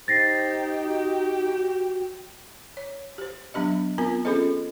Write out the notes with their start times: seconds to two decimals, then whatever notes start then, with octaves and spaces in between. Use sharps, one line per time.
0.08 D#4 G4 C5 A6 A#6 C7
0.85 F#4
2.77 C#5
3.18 G4 C5
3.54 F#3 B3 D4 G4 D#5
3.98 B3 C4 F4 A#4 G#5
4.25 C#4 F4 G#4 A4 C5 D#5